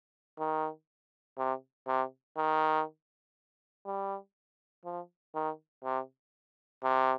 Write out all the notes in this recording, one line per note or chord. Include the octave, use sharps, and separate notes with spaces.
D#3
C3
C3
D#3
G3
F3
D#3
C3
C3